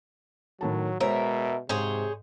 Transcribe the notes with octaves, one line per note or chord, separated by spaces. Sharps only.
A2 D#3 F#3 A5
B2 G#3 A#4 C5 C#5 E5
G#2 C3 G#4 C5 C#5